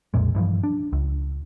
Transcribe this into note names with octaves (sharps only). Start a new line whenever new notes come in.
B1 F2 A#2 G#3
G2 E3 F3
D4
C#2